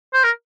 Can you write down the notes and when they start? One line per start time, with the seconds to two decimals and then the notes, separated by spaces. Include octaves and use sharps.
0.14 C5
0.23 A#4